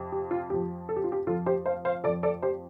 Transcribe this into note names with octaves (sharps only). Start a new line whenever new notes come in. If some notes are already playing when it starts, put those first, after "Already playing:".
Already playing: F2 C3 F3
G4
F4
F2 F3 G4
A4
G4
F4
G4
F2 F3 F4 A4
G4 C5
C5 F5
C5 F5
F2 F3 A4 D5
A4 D5
G4 C5